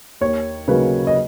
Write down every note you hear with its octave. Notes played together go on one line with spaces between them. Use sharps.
D#2 C#5
C#3 F#3 A#3 D#4 B4
D#5